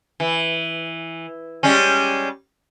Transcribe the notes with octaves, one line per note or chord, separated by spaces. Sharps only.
E3
G3 G#3 C#4